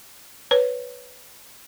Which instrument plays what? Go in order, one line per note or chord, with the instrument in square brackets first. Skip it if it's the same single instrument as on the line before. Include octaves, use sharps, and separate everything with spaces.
[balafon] B4 C#5